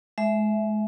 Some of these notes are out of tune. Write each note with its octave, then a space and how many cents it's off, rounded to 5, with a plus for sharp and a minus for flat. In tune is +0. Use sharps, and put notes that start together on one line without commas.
G#3 +35 E5 +0